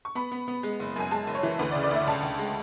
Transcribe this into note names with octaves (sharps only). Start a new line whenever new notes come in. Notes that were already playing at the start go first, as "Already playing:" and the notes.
C#6
B3 B5
B3
B3
G#3
F#1
F#2 G#5
G#3 A5
F#1
C#5
E3
D2 B4
D5
C#3
D5
D2 E5
C#2 A5
C#2
G#3